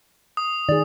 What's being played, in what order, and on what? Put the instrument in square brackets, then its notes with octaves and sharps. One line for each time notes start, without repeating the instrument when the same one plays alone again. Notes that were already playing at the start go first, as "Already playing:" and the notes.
[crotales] D#6
[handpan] D#3 G#4 [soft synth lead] D5